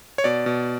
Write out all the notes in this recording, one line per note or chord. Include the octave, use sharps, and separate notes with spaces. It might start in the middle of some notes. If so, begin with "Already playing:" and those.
C#5
B2 D5
B2